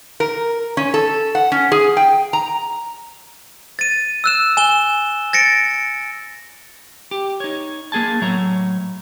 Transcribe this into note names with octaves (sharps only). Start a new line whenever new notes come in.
A#4
C#4
A4
F#5
C#4
G#4
G5
A#5
A6 D#7
E6 F#6 E7
G#5 E7 G7
A6 A#6 C#7 D7
G4
D#4 C#5
A#3 G#4 G#5 A5
A2 F#3 C#5 E5 A#5